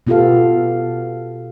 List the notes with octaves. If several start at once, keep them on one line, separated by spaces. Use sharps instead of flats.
B2 B3 F4 G4 A4 F5